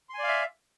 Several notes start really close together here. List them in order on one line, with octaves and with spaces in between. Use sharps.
C6 G#5 D5 F5 E5